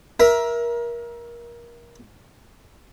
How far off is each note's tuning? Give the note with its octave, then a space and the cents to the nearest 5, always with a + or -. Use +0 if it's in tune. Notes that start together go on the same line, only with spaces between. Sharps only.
A#4 +25 E5 +0